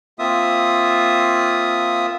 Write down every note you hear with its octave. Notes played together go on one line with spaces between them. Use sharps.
A#3 C4 F4 E5 D#6